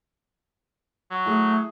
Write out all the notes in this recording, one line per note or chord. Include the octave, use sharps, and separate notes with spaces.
F#3
A3 E4 G#4